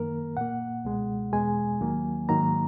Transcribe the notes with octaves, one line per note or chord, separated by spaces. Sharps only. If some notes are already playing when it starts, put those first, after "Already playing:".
Already playing: F#2 D#3 A#3 A#4
A#2 A#3 F#5
C#2 B2 G#3
E2 B2 G#3 G#5
D#2 D#3 F#3 A#3
G#2 D#3 F#3 A#3 A#5